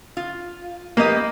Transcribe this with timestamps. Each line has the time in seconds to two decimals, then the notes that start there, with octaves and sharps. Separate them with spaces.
0.17 F4
0.97 A#3 G4 B4 D#5